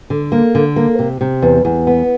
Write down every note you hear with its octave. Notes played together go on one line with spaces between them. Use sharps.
D3
A#3
D3
A#3
C3
C3
E2
E2
B3